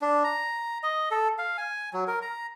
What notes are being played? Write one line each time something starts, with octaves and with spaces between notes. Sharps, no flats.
D4
A#5
D#5
A4
F5
G#5
F#3
A#4
A#5